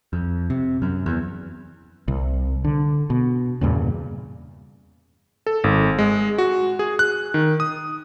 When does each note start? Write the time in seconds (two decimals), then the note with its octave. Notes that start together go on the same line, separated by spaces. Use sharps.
0.13 F2
0.50 C3
0.82 F#2
1.06 E2
2.08 C2
2.65 D3
3.10 B2
3.61 E2 G2 A#2 C#3
5.47 A4
5.64 G#1
5.99 G#3
6.38 F#4
6.79 G#4
6.99 F#6
7.34 D#3
7.60 D#6